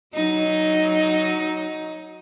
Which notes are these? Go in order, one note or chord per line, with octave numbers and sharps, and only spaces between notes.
F#3 D#4